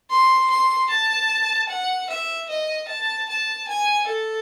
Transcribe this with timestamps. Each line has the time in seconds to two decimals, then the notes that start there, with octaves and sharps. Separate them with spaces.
0.10 C6
0.50 C6
0.89 A5
1.69 F#5
2.09 E5
2.49 D#5
2.89 A5
3.29 A5
3.68 G#5
4.07 A4